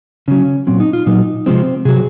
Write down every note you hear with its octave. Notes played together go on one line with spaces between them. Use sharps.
C#3 F#3 C#4
A#2 F#3 C4
D#4
F4
A#2 F#3 D#4
C3 F3 G#3 C4
C3 F#3 G#4